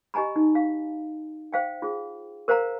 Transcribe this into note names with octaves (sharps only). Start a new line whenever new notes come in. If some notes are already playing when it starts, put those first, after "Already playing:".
G4 D#5 G#5 A#5 B5
D#4
F5
C5 F5 G5
F4 G#4
A#4 C5 F5 F#5 A#5